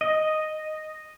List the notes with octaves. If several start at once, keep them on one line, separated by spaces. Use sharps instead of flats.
D#5